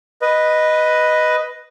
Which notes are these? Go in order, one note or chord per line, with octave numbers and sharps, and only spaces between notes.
B4 D#5